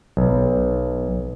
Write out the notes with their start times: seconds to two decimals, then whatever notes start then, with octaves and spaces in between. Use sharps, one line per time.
0.17 B1